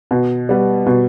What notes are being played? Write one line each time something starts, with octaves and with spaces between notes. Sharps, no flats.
B2
G3 B3
B2